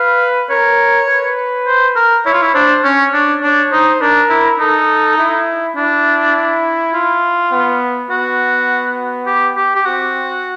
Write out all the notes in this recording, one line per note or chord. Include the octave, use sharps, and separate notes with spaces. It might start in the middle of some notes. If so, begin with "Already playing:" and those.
Already playing: B4 F5
A#4 C#5
B4
C5
A#4
E4 C#5
F4
E4
D4 C5
C#4 C#5
D4
D4 C#5
D#4 C5
D4 A#4
E4
D#4 A4
E4
D4 E4
F4
B3
B3 F#4
G4
G4
G4
C4 F#4